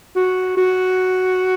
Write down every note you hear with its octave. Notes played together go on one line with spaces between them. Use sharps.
F#4
F#4